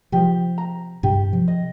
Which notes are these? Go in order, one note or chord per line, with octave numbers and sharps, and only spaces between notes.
C3 F3 G4
A#5
G2 C3 G4
C3 F3
D#5